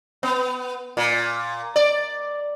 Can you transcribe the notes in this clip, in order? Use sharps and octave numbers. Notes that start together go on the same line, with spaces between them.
B3
A#2
D5